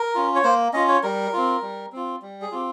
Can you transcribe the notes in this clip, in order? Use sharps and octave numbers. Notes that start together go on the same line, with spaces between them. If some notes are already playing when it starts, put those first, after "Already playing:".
Already playing: A#4
C#4 F4
C#5
A#3 C5
C#4 F4 D#5
C#5
G3 A#4
C4 F4
G3
C4 F4
G3
G#4
C4 F4 G4